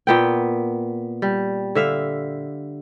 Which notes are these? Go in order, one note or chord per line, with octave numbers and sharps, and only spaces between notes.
A#2 B3 G5
G3
D3 E5 F5